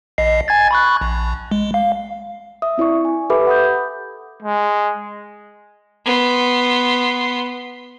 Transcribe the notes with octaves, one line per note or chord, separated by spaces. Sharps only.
A#1 D#5 C7
G#5 G#6 A6
B5 C#6 F#6
A#1
G#3
F5
E5 D#6
C4 E4 D5 C#6
G#5
G4 A4 B4 E5 B5 D6
F#5 B5 D#6 G6
G#3
B3 C6